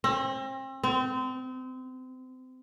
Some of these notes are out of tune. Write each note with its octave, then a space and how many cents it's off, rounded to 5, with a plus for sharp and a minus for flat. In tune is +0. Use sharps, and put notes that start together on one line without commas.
C4 +35
C4 -30